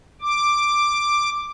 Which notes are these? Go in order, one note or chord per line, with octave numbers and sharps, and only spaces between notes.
D6